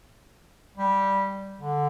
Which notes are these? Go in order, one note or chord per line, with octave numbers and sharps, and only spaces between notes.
G3
D3